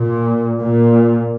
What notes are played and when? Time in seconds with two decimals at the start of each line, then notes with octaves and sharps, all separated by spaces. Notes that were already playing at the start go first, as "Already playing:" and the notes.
Already playing: A#2
0.61 A#2